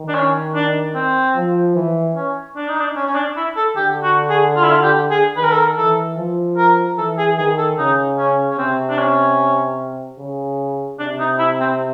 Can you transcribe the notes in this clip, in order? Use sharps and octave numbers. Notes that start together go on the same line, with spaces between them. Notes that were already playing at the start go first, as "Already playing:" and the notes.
Already playing: D#3
D4
C#4
D4
C4
F3
E3
C#4
D4
D#4
D4
C#4
C#4
D4
E4
A4
D3 G4
F#4
G#4
F4
E4
F4
G4
G#4
D#3 B4
A#4
A4
A#4
E3 A4
F3
A#4
E3 A4
G#4
D#3 G#4
A4
C#3 D#4
C#4
C#4
C3 C4
D4
C#4
C#3
C3 D4
D#4
E4
C4